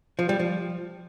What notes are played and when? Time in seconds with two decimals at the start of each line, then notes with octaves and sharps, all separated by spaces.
0.19 F3
0.29 G3
0.39 F3